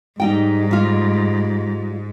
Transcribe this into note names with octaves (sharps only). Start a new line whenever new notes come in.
G#2 G3 D#4 G5
G3 F4